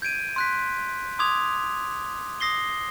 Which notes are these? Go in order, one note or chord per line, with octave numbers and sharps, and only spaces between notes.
G6 G#6 D7 D#7
C6 F#6 B6
C6 D6 D#6 G#6 F7
D#6 A#6 C7 G7